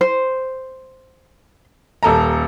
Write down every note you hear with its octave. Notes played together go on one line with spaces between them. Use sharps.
C5
D#1 A4 A#5